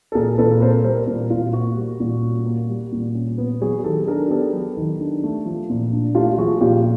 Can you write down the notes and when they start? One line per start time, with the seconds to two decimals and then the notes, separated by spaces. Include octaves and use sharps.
0.12 A4
0.15 A#2 G#4 A#4
0.38 A#2 A4 B4
0.61 C4 A#4 C5
0.84 G3 A#4 C5
1.07 A#2
1.30 A#2 F4
1.53 A#3 F#4
1.77 G3
2.00 A#2
2.24 C#4
2.46 A#3
2.69 G3
2.92 A#2
3.15 C#4
3.38 B3
3.61 F#3 F#4 G#4
3.84 D#3 G4 A4
4.07 D4 G#4 A#4
4.30 B3 G4 A4
4.53 F#3
4.77 D#3
5.00 D4
5.24 A3
5.46 F3
5.70 A#2
5.92 D4
6.15 A3 F4 G4
6.38 F3 F#4 G#4
6.61 A#2 F4 G4